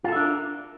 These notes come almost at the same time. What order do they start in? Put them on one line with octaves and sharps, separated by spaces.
F4 A4 E5 D4 A#4